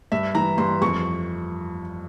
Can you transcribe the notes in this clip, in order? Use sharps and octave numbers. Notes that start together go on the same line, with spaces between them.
G2 E5
E3 A#5
G2 C6
F2 C#6